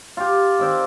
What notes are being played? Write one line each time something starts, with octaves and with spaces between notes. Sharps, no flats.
F4 G4
D#3 C4 D5